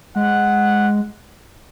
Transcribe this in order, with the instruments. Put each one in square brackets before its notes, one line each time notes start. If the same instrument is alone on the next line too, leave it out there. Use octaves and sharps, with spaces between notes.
[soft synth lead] G#3 [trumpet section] F#5